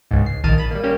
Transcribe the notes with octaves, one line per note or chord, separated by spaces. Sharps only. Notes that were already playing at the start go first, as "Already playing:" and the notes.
C#2 G#2
C7
A#1 D#3 A5 F6 D#7
B5 D#7
G3 A#3
G3 A#3 C#4 G4